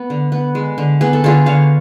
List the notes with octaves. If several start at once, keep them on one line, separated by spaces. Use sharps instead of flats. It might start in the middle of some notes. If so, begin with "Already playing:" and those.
Already playing: B3
D3
B3
G#3
D3
B3 G#4
A4
D3 F4 G#4
D3 C#5 F5